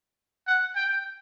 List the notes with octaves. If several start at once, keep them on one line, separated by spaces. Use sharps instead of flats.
F#5
G5